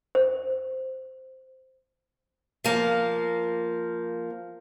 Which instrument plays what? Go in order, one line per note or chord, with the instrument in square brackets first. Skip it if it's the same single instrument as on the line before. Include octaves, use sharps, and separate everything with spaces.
[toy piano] C5
[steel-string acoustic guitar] F3 A#3